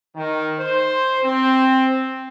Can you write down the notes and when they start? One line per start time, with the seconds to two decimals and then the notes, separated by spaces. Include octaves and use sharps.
0.15 D#3
0.58 C5
1.24 C4